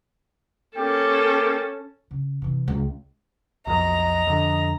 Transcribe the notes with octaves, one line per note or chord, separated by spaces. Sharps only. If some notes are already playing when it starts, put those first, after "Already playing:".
A#3 C#4 G4 A4 G5
C#3
C3 E3
C#2
B1 F2 D#5 A#5
F2 D3